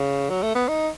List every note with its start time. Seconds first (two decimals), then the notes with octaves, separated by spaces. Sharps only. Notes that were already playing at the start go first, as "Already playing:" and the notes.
Already playing: C#3
0.30 F#3
0.43 A3
0.55 B3
0.68 D#4